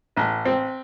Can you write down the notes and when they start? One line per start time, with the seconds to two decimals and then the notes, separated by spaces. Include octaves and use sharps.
0.16 A1
0.45 C4